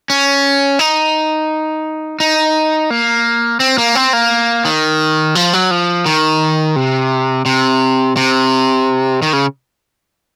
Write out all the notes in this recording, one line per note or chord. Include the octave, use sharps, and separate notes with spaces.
C#4
D#4
D#4
A#3
C4
A#3
C4
A#3
D#3
F3
F#3
F3
D#3
C3
C3
C3
D#3
C#3